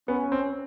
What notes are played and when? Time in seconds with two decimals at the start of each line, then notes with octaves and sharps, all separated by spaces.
0.08 B3 C#4
0.32 C4